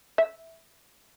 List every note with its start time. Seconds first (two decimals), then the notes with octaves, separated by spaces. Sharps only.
0.18 E5